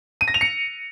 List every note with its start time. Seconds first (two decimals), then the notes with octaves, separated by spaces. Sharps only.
0.21 D#7
0.28 A#6
0.34 F7
0.41 C#7